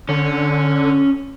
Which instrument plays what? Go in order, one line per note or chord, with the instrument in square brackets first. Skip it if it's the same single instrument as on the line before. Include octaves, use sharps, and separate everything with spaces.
[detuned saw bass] D3 [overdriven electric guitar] C#4